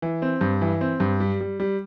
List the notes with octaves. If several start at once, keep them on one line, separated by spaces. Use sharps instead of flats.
E3
C4
G2
E3
C4
G2
G3
G3
G3